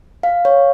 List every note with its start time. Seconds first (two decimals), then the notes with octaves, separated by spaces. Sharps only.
0.23 F5
0.45 C#5